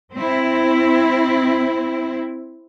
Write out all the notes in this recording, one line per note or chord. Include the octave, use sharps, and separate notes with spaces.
C4 E4